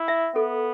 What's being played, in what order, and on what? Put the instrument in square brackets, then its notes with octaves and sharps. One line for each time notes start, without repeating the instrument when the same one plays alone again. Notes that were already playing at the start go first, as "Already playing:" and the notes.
Already playing: [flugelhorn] E4
[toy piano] E5
[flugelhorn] B3 [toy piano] A4